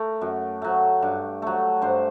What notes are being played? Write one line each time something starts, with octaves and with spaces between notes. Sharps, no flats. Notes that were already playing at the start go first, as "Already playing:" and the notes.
Already playing: A3 A#4
F#2
F#3 A3
G2
F#3 A3
G2 C5